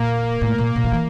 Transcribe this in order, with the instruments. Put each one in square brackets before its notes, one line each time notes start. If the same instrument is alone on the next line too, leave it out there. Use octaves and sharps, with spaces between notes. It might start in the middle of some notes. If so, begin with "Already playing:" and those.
Already playing: [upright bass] A#2 [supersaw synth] A#3
[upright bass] A2
A#2
A#2
D#3
E3